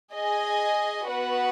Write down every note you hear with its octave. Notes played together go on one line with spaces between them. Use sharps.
G#4 D#5 G#5
B3 F#4 B4 F#5